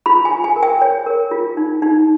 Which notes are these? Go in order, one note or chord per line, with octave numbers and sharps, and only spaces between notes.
F4 B5
G#5
F4
G#5
A#4
G5
C#5
A#4
F4
D#4
D#4